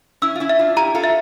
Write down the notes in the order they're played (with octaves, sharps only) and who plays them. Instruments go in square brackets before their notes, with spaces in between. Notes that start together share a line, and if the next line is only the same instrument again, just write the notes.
[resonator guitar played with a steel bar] C#4 E4 [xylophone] E6
[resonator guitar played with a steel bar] F4
C#4 E4
[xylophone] E5
[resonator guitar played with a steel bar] D4 F4
[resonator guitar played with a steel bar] E4 G4 [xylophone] A#5
[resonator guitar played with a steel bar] F4 A4
[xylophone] E5